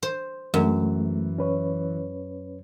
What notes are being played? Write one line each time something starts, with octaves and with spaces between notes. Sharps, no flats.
C5
F#2 E3 G#3 A3
C#4 B4 C#5